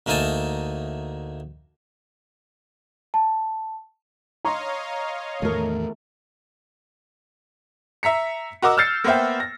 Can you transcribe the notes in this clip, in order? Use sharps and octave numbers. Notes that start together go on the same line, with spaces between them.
D2 A3 A#3 D#4 G#5 A5
A5
C#5 D#5 F5 A#5 C6 C#6
E2 A2 D#3 A3 A#4
E5 A#5 B6 C#7
F#4 A#4 D#5 D6 E6
E6 F6 G6 A6 C7 C#7
A#3 B3 C5 E5 G5
A#6